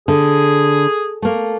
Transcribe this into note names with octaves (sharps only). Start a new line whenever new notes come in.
D3 G#4
A3 A#3